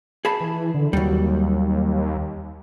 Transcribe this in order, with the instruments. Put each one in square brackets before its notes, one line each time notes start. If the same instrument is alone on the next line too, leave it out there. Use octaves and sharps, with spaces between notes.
[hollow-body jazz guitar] G#4 A5 B5
[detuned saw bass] E3
D3
[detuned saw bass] D#2 [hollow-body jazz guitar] F#3 G3